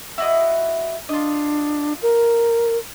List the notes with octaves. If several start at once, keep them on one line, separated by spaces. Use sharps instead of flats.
E4 F#4 D#5
D4 F4 D#5
A#4